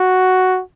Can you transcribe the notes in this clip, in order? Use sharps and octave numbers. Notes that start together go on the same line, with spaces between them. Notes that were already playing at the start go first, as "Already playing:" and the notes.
Already playing: F#4